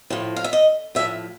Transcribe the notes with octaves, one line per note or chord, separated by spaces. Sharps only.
A2 F3
F5
E5
D#5
A2 F3 E5